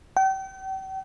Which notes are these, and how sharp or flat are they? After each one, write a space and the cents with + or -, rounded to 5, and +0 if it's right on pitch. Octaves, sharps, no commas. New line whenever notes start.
G5 -40